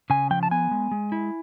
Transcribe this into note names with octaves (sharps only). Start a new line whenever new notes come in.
C#3 G#5
F3 G5
A5
B3 G#5
G#3
G#3
E4